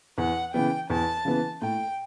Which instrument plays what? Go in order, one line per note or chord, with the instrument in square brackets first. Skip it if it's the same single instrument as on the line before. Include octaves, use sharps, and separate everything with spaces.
[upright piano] E2 [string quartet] F#5
[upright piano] C#3 E3 B3 [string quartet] G5
[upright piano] E2 [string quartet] A5
[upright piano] C#3 E3 B3
[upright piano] A2 [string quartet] G5